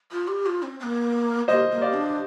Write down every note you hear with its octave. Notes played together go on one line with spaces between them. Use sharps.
F4
G4
F4
C4
C4
A#3
A#3 C5 D#5
A#3
D5 F5
D4